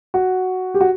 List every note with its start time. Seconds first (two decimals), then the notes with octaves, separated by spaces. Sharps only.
0.14 F#4
0.74 G4
0.81 F#4